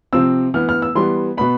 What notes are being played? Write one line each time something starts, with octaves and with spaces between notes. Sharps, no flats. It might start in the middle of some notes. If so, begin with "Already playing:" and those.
C3 F3 C4 E6
E3 B3 F6
F6
E6
E3 G3 B3 C6
B2 B3 B5